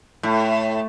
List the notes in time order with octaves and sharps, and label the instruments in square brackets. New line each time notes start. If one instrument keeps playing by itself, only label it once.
[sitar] A2 [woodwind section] A3